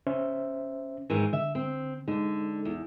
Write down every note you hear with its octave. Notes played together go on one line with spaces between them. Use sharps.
C#4 C5 E5
G#2 D#3 E3
D3 E5
C4
D3 G#3 D#4 A4
E2